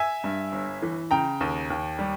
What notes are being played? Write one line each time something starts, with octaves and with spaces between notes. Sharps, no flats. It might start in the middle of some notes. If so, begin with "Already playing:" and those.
Already playing: E5 G#5
G2
G1
E3
C#3 G5 A#5
D#2
D#2
G3